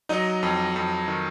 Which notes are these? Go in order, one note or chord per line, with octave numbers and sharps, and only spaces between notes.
F#3 D#4 D#5
F2
F2
D#3